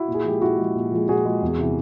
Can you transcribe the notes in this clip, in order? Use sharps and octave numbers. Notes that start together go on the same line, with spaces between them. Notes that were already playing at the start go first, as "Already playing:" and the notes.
Already playing: E4 F#4
A#2
G#4
F3 G#3 G4
A#2 E4 F#4
F3 G#3
A#2
F3 G#3
A#2 F#4 G#4
F3 G#3
E2
C3 E3